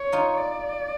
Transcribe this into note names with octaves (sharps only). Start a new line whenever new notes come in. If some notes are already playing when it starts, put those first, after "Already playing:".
Already playing: C#5
D#4 F4
D5